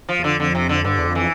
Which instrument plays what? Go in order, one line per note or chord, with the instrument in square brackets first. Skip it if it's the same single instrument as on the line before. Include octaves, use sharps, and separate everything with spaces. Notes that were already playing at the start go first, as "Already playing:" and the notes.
[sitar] F3
[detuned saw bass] E2
[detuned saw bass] F2 [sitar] D3
[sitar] D3
C3
D3
[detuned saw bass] G2 [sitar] D3
[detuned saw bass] E2
F2
[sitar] E3